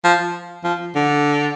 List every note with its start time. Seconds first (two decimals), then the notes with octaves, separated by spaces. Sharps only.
0.04 F3
0.64 F3
0.96 D3